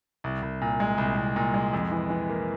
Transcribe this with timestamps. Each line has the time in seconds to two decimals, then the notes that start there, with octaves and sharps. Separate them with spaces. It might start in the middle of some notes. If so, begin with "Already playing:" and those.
0.24 C2
0.42 C2
0.61 A#2
0.80 G#3
0.98 C2
1.17 C2
1.36 A#2
1.54 G#3
1.73 F2
1.92 E3
2.10 E3
2.29 A#3